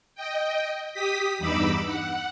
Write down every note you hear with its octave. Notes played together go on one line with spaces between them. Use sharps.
D#5 G5
G4 D#6 B6
E2 G2 D#4 B5 D6 E6
F#5